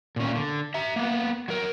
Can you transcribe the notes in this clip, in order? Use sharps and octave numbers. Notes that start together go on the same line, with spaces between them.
A#2 C#4
D3
E5 A#5
A#3 B3
F#3 A#4